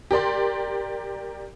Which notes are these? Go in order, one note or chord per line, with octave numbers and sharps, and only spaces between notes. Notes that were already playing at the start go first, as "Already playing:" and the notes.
G4 A#4 D5 C6